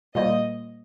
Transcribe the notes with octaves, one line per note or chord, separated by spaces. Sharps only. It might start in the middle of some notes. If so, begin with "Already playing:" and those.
A#2 G3 A#3 F4 C5 D#5